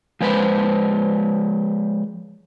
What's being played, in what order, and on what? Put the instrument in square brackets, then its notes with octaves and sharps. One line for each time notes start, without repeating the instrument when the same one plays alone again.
[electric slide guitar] F3 G#3 B4 C5